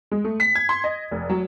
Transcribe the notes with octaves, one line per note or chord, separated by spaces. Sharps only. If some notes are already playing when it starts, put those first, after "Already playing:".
G#3
A3
B6
G#6
C6
D#5
F1
F#3